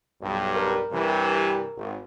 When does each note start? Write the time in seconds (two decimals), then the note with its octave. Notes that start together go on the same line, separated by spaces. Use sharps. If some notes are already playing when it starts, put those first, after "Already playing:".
0.21 B1 G2
0.56 A#4
0.91 G2 C3 E3
1.76 G#1